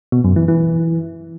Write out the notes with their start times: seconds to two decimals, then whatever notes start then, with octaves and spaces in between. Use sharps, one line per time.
0.12 B2
0.24 F#2
0.36 E3
0.48 E3